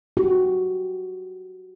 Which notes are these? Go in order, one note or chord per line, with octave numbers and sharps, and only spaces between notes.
F#4 G4